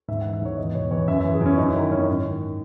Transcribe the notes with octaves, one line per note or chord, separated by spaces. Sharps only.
G#2 E5
E3 F#5
E5
G#2 C#5
E2 D#5
B2 C#5
E2 C#5
F#2 E5
E3 E5
G#4
F#2
C#4
F#2 D#4
E4
D#3 D#4
F#2 C#4
D#4
G#2 C#4
D#3